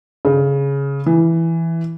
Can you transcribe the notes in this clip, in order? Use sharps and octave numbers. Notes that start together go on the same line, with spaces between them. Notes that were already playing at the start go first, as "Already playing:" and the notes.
C#3
E3